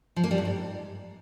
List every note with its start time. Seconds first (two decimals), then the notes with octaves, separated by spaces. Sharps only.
0.16 F3
0.24 A#3
0.31 G3
0.38 G2
0.45 G#2